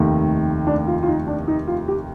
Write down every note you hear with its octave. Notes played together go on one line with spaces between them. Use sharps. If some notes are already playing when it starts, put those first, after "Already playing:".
Already playing: F1 D#2 D#3 A3
D4
F4
F4
D#4
D4
D#4
F4
G4